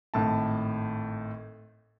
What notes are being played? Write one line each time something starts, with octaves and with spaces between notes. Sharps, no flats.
G#1 A2 A5